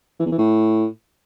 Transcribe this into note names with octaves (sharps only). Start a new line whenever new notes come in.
E3
E2
E3
A2